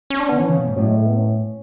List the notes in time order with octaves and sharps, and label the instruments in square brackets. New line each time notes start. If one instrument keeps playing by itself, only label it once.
[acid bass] C#4
D4
B3
[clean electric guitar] D3
[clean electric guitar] E3 [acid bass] C#4
[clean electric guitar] C#3
B2
G#2
[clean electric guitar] A2 [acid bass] F#3
[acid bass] G#3
A3
B3
C#4